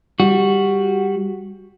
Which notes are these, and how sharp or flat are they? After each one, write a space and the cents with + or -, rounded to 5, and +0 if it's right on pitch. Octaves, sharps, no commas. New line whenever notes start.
G3 +10 F#4 +0